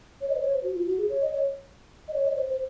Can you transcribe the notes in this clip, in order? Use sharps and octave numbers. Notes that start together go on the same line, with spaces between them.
C#5
D#5
C5
C#5
C5
F#4
F4
F#4
G#4
C#5
D#5
C#5
D#5
C#5
D#5
C#5
C5
C5